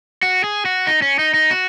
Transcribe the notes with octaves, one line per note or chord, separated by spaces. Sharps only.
F#4
G#4
F#4
D#4
C#4
D#4
D#4
F#4